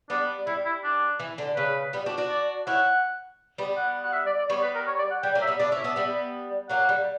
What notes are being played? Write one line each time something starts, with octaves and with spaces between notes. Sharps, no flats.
G3 B3 D4
G3 E4
E4
D4
E3
D3
C#3 B4
G3 B3
D4 F#4
D4 F#4
D5
C#4 E4 F#5
G3 B3
F#5
F#5
E5
D5
D5
G3 B3 C#5
B4
A#4
C#5
D5
F#5
G3 G5
F#3 A#3
E5
G3 B3
B3 D4 D5
C#4 E4
E5
B3 D4
G3 B3
F#3 A#3 F#5
G3